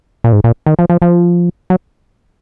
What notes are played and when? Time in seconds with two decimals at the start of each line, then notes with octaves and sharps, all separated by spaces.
0.24 A#2
0.33 G#2
0.44 A#2
0.66 D#3
0.79 F3
0.90 F3
1.02 F3
1.70 F#3